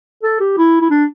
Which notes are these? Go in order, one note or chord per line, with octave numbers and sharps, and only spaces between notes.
A4
G4
E4
E4
D4